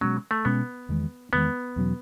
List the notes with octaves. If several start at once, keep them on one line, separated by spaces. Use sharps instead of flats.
B2 F#3 G#3 C#4
A3
B2 G#3 B3 C#4
E2 D#3 G#3
E2 D#3 G#3 B3
E2 B2 F#3 C#4